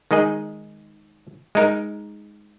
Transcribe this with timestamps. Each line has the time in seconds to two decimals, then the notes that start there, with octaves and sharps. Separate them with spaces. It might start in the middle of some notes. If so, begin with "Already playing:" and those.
0.11 D#3 G#3 D#4 G#4 D#5
1.55 G#3 D#4 A#4